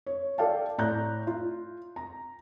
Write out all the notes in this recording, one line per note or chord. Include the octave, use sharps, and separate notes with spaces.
C#5
A4 D5 F5 G5 A5
A2 D5 A#5 F#6 G6
F4
A#5